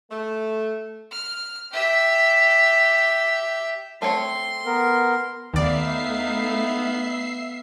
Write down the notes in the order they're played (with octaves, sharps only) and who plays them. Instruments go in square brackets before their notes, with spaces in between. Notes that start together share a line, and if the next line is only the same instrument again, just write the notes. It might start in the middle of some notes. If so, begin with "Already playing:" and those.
[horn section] A3
[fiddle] F6
G4 E5
[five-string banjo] A3 C4 C#5 [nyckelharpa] C6
[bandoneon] B3 A#4
[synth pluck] D#2 D5 [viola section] A3 D#4 [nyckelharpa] B3 F5 [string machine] E5 C7